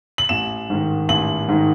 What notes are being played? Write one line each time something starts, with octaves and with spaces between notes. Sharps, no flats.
F#7
A1 E7
G#2 D#3
A1 F#7
G#2 D#3